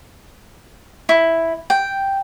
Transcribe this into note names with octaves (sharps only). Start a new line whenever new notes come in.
E4
G5